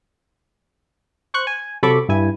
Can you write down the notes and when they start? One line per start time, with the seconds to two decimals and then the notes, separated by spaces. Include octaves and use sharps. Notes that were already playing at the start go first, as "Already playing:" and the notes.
1.34 C5 C#6 F#6
1.47 G#5
1.83 C3 F#3 A4 B5 C#6 D6
2.09 G2 E4 G#5